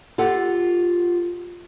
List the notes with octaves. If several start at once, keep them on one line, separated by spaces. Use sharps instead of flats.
F4 G4 A4 F#5